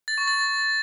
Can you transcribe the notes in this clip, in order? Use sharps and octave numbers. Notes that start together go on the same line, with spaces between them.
A6
C#6
A6